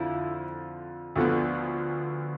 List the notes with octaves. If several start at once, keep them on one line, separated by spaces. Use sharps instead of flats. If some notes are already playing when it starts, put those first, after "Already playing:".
Already playing: F2 D3 F3 E4
D2 D3 F3 B3